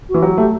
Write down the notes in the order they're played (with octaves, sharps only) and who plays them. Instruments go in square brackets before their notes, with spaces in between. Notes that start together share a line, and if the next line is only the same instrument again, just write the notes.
[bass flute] F#4
[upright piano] E3
[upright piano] F#3 [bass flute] G4
[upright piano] A3 [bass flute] G4